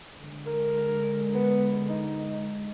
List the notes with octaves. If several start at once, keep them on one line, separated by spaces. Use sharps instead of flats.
D3 G#3
A#4
B3
D#4